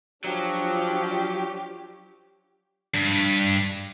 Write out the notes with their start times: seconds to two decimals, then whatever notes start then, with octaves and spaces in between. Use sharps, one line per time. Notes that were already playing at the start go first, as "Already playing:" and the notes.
0.24 F3 F#3 D4 F4 G4
2.95 G2